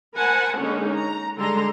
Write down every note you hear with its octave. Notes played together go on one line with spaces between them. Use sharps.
A#4 C5 F#5 G#5 A5 B5
D3 G#3 A#3 C#4 D#4 G#4
A#5
D3 G3 G#3 A4 A#5 C6